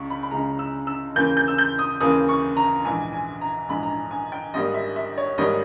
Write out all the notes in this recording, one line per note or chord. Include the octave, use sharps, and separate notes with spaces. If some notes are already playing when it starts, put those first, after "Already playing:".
Already playing: C#2 C#3 G#3 C#6
B5
B5
C#2 C#3 G#3 A#5
E6
E6
D#2 C#3 E3 A#3 G6
G6
E6
G6
D#6
D#2 C#3 E3 A#3 D#6
C#6
A#5
A#1 G#2 E3 G#5
G#5
A#5
A#1 G#2 E3 B5
A#5
G#5
G#5
G5
G#1 G#2 G3 A#3 D#5
E5
E5
C#5
G#1 G#2 G3 A#3 D#5